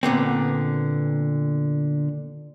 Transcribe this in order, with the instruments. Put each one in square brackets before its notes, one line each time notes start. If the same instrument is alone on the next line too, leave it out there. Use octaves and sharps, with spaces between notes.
[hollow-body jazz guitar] A#2 D3 B3 C4